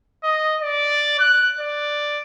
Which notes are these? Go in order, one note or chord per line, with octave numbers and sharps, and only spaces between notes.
D#5
D5
F#6
D5